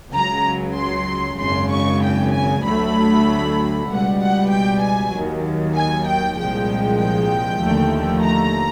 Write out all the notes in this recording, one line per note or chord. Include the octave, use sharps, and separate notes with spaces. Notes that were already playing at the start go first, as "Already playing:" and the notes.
C#2 C#3 F#3 A#5
C6
G#1 F#2 C#3 C6
C#6
G5
G#5
D2 D3 F#3 A3 B5
C#2 B2 G3 F#5
F#5
G5
G#5
D#2 D#3 F#3
G#5
G5
C2 A#2 F3 G#3 G5
G5
D#2 D3 F3 A3
A#5